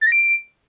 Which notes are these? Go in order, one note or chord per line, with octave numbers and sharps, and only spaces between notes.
A6
A#6
D7